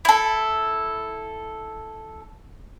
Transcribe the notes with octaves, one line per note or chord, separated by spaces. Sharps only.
E4 A4